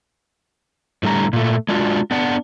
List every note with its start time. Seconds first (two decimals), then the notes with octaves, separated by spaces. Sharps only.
1.03 A2 D3 G3 A#5
1.33 A#2 A3
1.69 G#3 D4 D#4 F4 F#4
2.11 B3 D4 F#5